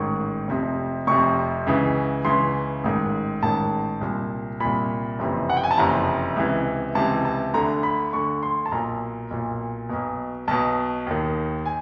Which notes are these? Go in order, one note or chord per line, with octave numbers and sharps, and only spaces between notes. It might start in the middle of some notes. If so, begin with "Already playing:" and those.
Already playing: A1 G#2 D#3 C#6
F1 F2 C3
F1 F2 C3 C#6
C#2 C#3 E3
C#2 C#3 E3 C6
A1 G#2 D#3
A1 G#2 D#3 A5
C2 A#2
C2 A#2 B5
F#1 F2 C3 E3
F#5
G5
G#5
A5
F#1 F2 C3 E3 A#5
C#2 C3 E3
C#2 C3 E3 A5
A5
D2 D3 A#5
B5
D2 D3 C#6
C6
A5
B1 A#2 A#5
B1 A#2
B1 B2
B1 B2 A5
D#2 D#3
G#5